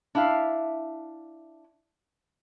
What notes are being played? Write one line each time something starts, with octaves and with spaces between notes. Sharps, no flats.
D4 E4 E5 F5